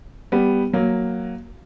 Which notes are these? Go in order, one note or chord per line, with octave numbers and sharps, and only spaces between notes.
G3 B3
F#3 A#3